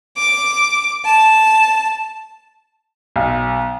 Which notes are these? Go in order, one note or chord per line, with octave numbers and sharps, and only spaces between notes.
D6
A5
B1